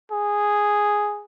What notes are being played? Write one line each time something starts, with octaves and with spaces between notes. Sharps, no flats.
G#4